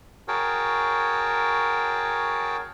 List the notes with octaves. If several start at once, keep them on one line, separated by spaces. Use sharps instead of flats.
F#4 G#4 A#4 C#5 G5 A5